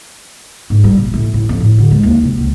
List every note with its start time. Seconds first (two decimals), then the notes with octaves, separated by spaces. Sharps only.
0.70 G#2
0.84 G3
0.97 A#2
1.14 A2
1.34 A2
1.49 F2
1.61 A2
1.78 D3
1.91 G#3
2.03 D#2
2.23 C3
2.38 C#2